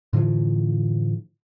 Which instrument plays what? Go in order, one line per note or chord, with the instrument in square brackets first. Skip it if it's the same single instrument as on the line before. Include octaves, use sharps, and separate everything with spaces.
[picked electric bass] A2 D3 E3 F3